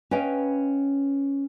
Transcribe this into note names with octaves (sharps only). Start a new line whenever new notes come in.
C#4 B4 C#5 D#5 F5 G5